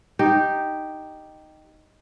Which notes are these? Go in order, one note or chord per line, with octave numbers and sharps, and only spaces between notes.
D#4 G4